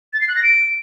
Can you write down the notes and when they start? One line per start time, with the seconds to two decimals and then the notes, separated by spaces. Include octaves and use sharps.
0.13 A6
0.21 C7
0.28 F#6
0.36 A#6
0.43 D7